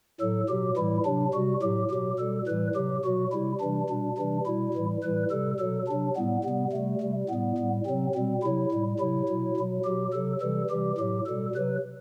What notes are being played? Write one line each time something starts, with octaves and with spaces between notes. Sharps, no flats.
A2 F#3 A4
B2 F#3 G4
A2 E3 G3 E4
C3 F#3 D4
C3 G3 F#4
A2 F#3 G4
B2 F#3 G4
B2 G3 A4
A2 E3 G3 B4
C3 F#3 G4
B2 F#3 F#4
C3 G3 E4
C3 E3 G3 D4
B2 G3 D4
C3 E3 G3 D4
B2 G3 E4
A2 E3 G3
A2 E3 G3 B4
C3 G3 A4
B2 F#3 A4
C3 F#3 D4
A2 G3 B3
C3 G3 B3
C3 G3 A3
C3 G3
A2 G3 B3
A2 G3
C3 F#3 C4
B2 G3 C4
C3 F#3 E4
A2 G3
C3 F#3 E4
B2 F#3
B2 F#3
B2 F#3 G4
C3 F#3 A4
C3 E3 G3 A4
C3 E3 G3 G4
A2 F#3 G4
B2 G3 A4
C3 F#3 B4